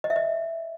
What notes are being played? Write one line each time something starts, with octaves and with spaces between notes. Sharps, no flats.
D#5
E5
D#5